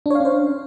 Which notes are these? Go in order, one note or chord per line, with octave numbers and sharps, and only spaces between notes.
C#4 D4 C5 C#5 F5